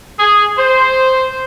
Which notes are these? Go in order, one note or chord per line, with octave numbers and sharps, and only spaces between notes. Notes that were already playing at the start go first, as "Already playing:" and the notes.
G#4
C5